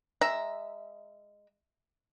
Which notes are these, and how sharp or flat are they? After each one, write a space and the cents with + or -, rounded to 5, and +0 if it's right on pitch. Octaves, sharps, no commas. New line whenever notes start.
G#3 -20 E5 +0 A#5 +0